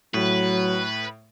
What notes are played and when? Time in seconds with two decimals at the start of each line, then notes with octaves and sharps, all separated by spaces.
0.14 A2 F#3 B4